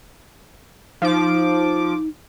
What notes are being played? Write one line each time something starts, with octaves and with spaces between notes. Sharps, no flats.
F3 D#4 D6